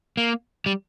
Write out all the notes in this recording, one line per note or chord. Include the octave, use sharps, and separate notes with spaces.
A#3
G3